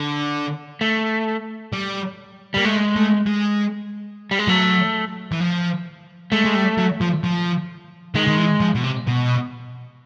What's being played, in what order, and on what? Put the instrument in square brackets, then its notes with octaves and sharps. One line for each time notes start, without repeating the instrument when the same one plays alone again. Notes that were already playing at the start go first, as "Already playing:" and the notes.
Already playing: [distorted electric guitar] D3
[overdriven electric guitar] A3
[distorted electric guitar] G3
[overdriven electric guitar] G3 [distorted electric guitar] A#3
[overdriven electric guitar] G#3 [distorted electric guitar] A3
[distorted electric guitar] A3
G#3
[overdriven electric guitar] G3
G#3
[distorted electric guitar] F#3 [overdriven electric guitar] A3
[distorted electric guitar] E3
F3
[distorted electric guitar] G#3 [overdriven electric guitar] A3
[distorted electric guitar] G#3
G3
F#3
F3
F3
[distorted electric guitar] D#3 [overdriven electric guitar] G#3
[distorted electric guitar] D#3
E3
F3
B2
C3
B2